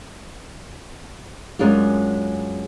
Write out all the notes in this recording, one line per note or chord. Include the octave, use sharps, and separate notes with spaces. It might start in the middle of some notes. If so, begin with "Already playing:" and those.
F#2 G#3 C#4 D4 F4